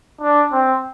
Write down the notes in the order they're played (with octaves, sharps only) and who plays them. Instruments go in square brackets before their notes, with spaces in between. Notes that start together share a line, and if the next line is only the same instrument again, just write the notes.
[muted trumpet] D4
C4